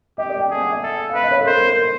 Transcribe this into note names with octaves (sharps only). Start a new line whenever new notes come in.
G4 D#5
D5
G5
G#4 A5
F#5
E5
A4
F5
B4 E5
D#5
C#5
A4
A#4 C5
A#4
A#4